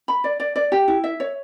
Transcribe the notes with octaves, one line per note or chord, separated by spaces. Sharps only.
B5
D5
D5
D5
G4
E4
E5
C#5